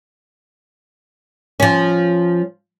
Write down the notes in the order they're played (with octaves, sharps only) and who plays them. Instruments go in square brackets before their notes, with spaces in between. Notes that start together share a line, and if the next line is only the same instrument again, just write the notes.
[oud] F3 C#4